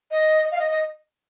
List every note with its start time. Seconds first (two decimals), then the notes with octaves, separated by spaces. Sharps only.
0.11 D#5
0.52 F5
0.59 D#5
0.71 D#5